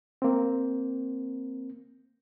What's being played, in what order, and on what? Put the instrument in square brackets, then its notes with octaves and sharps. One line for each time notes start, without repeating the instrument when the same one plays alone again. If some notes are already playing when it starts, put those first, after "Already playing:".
[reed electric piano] A#3 C4